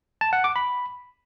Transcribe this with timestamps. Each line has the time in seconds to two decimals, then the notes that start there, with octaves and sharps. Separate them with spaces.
0.21 A5
0.33 F#5
0.44 D6
0.56 B5